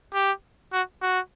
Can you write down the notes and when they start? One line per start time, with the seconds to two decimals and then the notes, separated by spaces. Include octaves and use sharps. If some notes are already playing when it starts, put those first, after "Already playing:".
0.14 G4
0.73 F#4
1.02 F#4